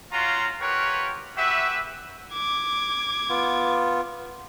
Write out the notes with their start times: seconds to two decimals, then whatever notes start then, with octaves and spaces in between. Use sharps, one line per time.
0.13 C#4 F4 F#4 F5 A#5 C6
0.61 F4 G4 A#4 B4 C#5 F#5
1.37 F#4 G4 B4 E5
2.33 D6 G#6
3.29 B3 F4